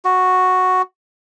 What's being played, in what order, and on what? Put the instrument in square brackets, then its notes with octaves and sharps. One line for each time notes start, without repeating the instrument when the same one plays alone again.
[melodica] F#4